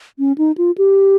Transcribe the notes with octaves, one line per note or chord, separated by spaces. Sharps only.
C#4
D#4
F4
G4